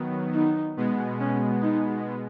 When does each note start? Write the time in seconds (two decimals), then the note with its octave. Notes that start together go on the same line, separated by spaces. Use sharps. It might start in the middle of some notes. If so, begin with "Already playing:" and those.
Already playing: D#3 F#3 B3
0.35 D#4
0.77 B2 G#3 B3
1.20 C#4
1.62 D#4